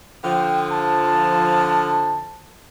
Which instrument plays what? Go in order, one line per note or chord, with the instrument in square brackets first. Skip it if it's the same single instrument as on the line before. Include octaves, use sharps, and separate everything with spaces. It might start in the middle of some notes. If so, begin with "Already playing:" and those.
[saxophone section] D3 F3 [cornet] G5
[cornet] A5